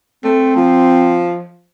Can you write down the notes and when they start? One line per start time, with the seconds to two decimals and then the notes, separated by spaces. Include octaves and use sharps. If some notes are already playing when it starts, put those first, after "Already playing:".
0.24 A3 C4
0.56 F3